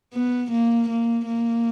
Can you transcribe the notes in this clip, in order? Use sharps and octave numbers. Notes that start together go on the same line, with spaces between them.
B3
A#3
A#3
A#3